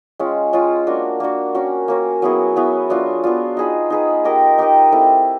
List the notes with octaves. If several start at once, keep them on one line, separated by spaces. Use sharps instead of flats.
G#3 C#4 F4
G#3 C#4 F4
A#3 D4 F#4
A#3 D4 F#4
A#3 C#4 F#4
A#3 C#4 F#4
F#3 B3 E4 G#4
F#3 B3 E4 G#4
F#3 B3 D4 F4
F#3 B3 D4 F4
D#4 G#4 B4
D#4 G#4 B4
D#4 G4 A#4 D#5
D#4 G4 A#4 D#5
C4 E4 A4